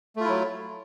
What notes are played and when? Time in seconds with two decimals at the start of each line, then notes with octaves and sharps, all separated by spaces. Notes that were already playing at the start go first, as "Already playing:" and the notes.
0.16 A3
0.20 F4
0.25 E4
0.29 F#3